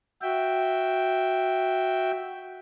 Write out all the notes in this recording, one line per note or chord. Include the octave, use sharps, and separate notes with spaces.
F#4 E5 G5